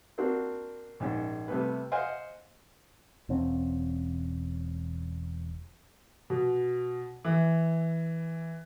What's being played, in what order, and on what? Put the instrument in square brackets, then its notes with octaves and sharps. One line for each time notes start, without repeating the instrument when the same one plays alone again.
[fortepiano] A#3 C4 D4 F#4
A#1 G#2 C#4
C3 G3 A3 B3 B4
C5 D#5 F5 F#5 G#5 C6
[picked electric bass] E1 C4 C#4
[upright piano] B2
E3